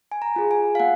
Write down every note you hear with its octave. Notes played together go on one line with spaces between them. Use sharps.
G#5
A#5
F4 G#4
G#5
F5
A#3 F#5